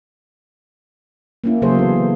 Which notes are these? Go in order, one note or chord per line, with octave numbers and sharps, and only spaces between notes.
A#3 C#4 E4
C#3 F#3 A#3 G#4 A4 C5
E3 B3